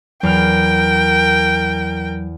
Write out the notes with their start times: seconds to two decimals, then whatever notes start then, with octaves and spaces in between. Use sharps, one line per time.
0.23 E2 F#3 A#4 G5 F6